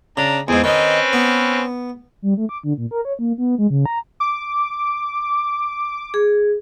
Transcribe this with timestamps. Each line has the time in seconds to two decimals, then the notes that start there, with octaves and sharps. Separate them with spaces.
0.17 C#3 D4 A#5
0.48 E2 G#2 C4 G#4
0.64 D#3 C4 C#4 D#4 B4
1.13 B3
2.22 G3
2.37 A3
2.49 D6
2.63 D3
2.78 A#2
2.91 A#4
3.05 C#5
3.19 A#3
3.38 B3
3.58 G#3
3.70 C#3
3.86 A#5
4.20 D6
6.14 G#4